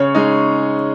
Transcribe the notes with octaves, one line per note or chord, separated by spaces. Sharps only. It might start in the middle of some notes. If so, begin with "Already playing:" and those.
Already playing: C#3 C#5
G#3 D#4